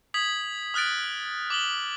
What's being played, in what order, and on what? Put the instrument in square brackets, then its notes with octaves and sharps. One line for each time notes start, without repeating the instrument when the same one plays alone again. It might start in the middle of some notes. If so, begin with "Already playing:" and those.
[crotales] D#6 G#6 B6 F#7
D#6 F6 F#6 A6 D7
D6 F#7 G7